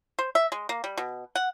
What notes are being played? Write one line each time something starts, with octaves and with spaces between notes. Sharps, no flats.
C5
E5
G#3
A#3
G3
B2
F#5